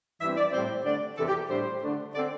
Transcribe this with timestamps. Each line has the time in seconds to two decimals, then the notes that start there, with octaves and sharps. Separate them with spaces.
0.21 G2 E3 C4 E5
0.37 D5
0.53 A2 G3 C4 C5
0.84 D3 A3 D4 D5
1.17 E2 C3 E3 A4
1.28 G4
1.50 A2 G3 D4 C5
1.83 D3 A3 D4
2.14 D3 C4 D5